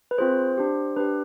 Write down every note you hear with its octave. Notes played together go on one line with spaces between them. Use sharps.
B4
C4 F4 G#4 C5
D4 G4
D4 G4 B4